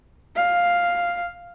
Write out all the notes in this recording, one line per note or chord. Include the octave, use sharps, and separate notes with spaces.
F5